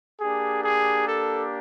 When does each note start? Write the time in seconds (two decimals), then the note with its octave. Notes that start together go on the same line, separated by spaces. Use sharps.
0.21 A#3 D4 G4 G#4
0.63 G#4
1.06 A4